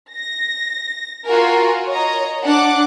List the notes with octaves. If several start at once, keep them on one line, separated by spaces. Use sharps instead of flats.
A#6
F4 F#4 A#4 G#5
C#5 D#5 A#5
D4 F#5 D6